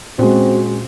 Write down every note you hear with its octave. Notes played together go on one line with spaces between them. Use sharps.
A#2 G#3 C4 C#4 F#4